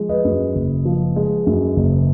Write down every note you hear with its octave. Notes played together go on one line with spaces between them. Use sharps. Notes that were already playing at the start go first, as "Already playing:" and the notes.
Already playing: F3 G#3
B4 D#5
F#2
F#1
F3
G#3
F#2
F#1